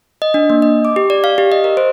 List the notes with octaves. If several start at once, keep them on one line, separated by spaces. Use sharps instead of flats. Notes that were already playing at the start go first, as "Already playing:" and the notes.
D#5
D4
A#3
D#5
D6
G4
D5
F5
G4
D#5
A#4
C5